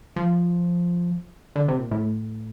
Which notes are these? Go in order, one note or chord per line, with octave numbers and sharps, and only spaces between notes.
F3
D3
C3
A#2
A2